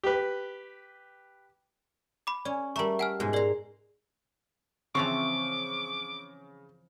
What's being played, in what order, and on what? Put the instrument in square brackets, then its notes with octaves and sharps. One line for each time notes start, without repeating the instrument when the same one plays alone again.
[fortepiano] G4 B4
[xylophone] B5 D6
[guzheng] C#4 [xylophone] D5
[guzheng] G3 A3 [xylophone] A#4 A#5 C#6
[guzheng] E5 [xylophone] F#5 G#5 F6
[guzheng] G#2 B2 G#3
[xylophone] A#4 D5 [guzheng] A#5 C6
[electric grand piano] C#3 C#6 [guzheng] E3 F3 C4 [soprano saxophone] D6